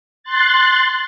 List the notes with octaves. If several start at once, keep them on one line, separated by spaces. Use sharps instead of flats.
C6 F#6 A6